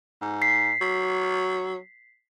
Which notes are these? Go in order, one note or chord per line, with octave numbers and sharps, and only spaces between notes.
G#2
B6 C7
F#3